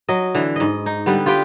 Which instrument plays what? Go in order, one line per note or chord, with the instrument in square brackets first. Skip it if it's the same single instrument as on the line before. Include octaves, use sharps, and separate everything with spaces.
[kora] F#3 D#5
D3 E3
G#2 D#5
D#4
D3 G3 B3
F4 G4 B4 G5